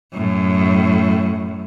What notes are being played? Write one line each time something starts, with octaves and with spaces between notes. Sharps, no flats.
F#2 A2